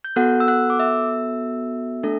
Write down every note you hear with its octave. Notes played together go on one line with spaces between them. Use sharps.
G6
B3 F#4 A4 F#5 F#6
E6
F#5 F#6
D6
E5 E6
A3 D4 A4